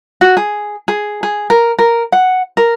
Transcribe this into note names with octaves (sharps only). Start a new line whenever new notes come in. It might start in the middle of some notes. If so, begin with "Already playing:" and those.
F#4
G#4
G#4
G#4
A#4
A#4
F#5
A#4